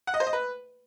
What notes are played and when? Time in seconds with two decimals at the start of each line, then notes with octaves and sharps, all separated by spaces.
0.07 F#5
0.14 D#5
0.20 C5
0.27 D#5
0.33 B4